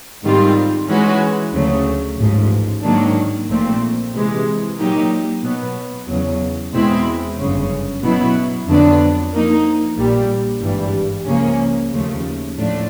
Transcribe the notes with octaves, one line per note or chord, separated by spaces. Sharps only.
G#2 D#3 G3 C4 F4
E3 G#3 C#4 F#4 B4
D2 C#3 F#3 A3
A1 G#2 F3
G#2 D#3 F#3 A#3 D4
A#1 A#2 F3 A3 C4
C3 E3 G#3
A#2 F#3 A#3 D#4 G4
B2 F#3 B3
E2 C#3 F#3
E2 B2 G#3 C4 E4
G1 F#2 C#3
B2 F#3 B3 E4
F2 D3 F#3 B3 D4
F3 A#3 D#4
A#1 A#2 G3
G#1 G2 E3 G3
C#2 C#3 F3 A#3 C#4
D#2 C#3 F3 A3
A2 F3 A3 D4